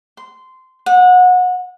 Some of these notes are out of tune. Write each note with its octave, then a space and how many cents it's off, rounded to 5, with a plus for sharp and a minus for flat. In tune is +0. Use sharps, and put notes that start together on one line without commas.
C6 -15
F#5 -25